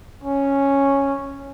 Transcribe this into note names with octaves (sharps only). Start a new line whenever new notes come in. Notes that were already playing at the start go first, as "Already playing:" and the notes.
C#4